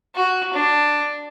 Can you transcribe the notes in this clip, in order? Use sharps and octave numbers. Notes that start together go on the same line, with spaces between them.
F#4
D4